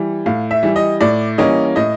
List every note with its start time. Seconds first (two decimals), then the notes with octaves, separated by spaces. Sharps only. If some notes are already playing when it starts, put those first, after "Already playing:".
Already playing: E3 G3
0.26 A2 F5
0.51 E5
0.63 E3 G3
0.76 D#5
1.01 A2 D5
1.38 E3 G3 A#3 C#4 D#5
1.76 A2 D#5